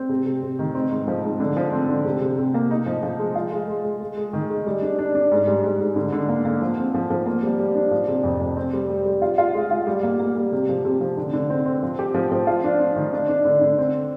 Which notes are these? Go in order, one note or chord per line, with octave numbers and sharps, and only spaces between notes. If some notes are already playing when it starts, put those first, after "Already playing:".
Already playing: C4
C3
C3
C3
D#3
C4
G#2
F3
G#2
D3
F3
C4
D3
C3
C3
C3
A#3
D#4
F3
F3
G#3
F4
G#3
G#3
G#3
G#3
G#3
D#3
G#3
G3
D4
D4
D4
G#2
G3
G#2
G#2
D3
D3
A#3
A#3
F3
C4
F3
F3
A#3
G3
G3
D4
F3
C3
F2
F2
C4
G3
G3
G3
F4
F4
G#3
F4
G3
A#3
A#3
G3
C3
F3
C3
F3
D3
D3
C4
C4
F3
G4
F3
F3
F4
D4
D4
D#3
D4
D4
D3
D3
C4